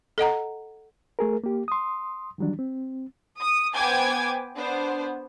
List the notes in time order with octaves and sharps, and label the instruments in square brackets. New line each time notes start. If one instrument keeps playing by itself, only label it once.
[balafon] A4 D#5 F#5 A#5
[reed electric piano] A3 G#4 A#4
A#3 G4
C6 D#6
D#3 E3 F#3 G3 D4
C4
[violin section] D#6
B3 C5 G5 G#5 D6 G#6
B3 D4 C5